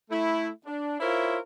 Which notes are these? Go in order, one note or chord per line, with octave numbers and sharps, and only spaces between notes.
A3 E4
D4
E4 F4 A#4 C5 C#5 E5